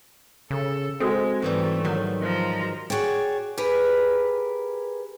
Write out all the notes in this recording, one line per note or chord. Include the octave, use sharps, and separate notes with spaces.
C#3 A4
G#3 C4 F#4 A4 C5
G#2 E3 G3 A3
D#3 F#3
F3 A#5
F#4 G#4 C#5 D5 G5
G4 G#4 A#4 B4